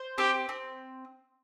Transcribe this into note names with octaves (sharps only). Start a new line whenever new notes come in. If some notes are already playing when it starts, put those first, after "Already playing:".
Already playing: C5
C4 G4
C4